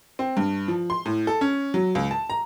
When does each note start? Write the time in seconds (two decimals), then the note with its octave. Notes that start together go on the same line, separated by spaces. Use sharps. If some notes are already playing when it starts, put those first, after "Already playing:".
0.19 C4
0.37 G2
0.68 F3
0.90 C6
1.05 A2
1.27 A4
1.41 C#4
1.74 F#3
1.95 C#2
2.11 A5
2.30 A#5